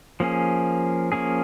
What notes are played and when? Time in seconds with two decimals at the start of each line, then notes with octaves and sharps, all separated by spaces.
0.20 F3 A#3 C#4 G#4
1.12 F3 A#3 C#4 G#4